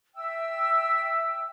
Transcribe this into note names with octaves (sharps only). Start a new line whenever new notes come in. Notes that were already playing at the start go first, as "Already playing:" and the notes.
E5 G5 E6